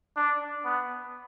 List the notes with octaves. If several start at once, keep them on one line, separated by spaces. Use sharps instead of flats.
D4
B3